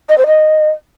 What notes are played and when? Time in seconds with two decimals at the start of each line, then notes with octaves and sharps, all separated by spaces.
0.09 D#5
0.18 C5
0.27 D#5